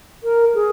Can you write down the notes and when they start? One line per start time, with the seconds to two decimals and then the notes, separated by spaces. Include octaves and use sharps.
0.23 A#4
0.55 G#4